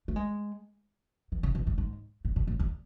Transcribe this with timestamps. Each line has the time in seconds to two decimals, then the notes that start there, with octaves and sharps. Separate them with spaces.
0.08 A3
0.16 G#3
1.32 E3
1.43 C#3
1.55 B2
1.67 G#2
1.78 G#2
2.25 A2
2.36 B2
2.47 A2
2.59 E2